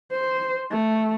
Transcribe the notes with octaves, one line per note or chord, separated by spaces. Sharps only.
C5
A3